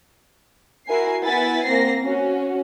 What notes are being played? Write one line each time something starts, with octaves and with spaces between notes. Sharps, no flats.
E4 F#4 A#4 G#5 C7
B3 E4 F#5 G#5 A6 B6
A#3 C4 A#6 C7
C#4 F#4